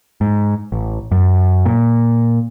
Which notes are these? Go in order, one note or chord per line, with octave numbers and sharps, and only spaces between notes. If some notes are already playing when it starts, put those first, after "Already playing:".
G#2
A1
F#2
A#2